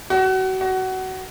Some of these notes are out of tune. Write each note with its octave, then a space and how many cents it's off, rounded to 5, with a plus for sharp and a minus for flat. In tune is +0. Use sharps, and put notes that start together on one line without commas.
F#4 +30
F#4 +20